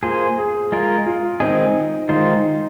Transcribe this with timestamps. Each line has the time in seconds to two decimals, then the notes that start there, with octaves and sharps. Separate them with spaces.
0.03 A#3 F4 G#4 C5
0.38 G#4
0.72 G#3 F4 A#4
1.06 F4
1.40 D#3 G#3 C4 D#4 G#4
2.09 D#3 G#3 D#4 F4 C5